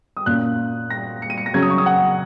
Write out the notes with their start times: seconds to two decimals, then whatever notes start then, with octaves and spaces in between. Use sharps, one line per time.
0.17 D#6
0.26 A#2 A#3 C#4 F#6
0.90 A#6
1.22 C#7
1.30 D#7
1.38 C#7
1.46 A#6
1.54 C#3 F#3 C#4 G#6
1.62 D#6
1.70 C#6
1.78 D#6
1.86 F#5